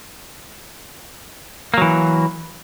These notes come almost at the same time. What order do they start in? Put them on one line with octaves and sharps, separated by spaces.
A#3 F#3 E3